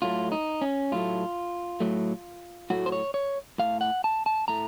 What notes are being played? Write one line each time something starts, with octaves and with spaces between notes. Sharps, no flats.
A2 F#3 A3 F4
D#4
C#4
A2 F#3 A3 F4
A2 F#3 A3
A2 F#3 A3 F#4
C5
C#5
C#5
A2 A3 F5
F#5
A5
A5
A2 A3 A#5